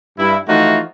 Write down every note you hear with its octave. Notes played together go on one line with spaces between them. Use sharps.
G2 E4
E3 F3 A3 D#4 F4 F#4